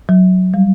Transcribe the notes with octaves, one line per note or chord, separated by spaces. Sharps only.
F#3
G3